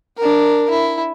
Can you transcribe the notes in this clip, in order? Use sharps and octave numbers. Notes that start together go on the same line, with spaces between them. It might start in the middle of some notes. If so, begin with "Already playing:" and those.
D4 A#4
E4